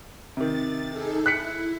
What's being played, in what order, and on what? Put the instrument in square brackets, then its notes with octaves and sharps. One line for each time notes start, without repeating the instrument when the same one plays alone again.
[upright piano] C3 D#3 [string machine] A6
[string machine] D#4 G#4 A4
[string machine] E4 [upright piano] F#6 B6 C#7